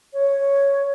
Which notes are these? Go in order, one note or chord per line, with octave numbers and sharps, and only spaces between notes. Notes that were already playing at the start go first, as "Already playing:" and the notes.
C#5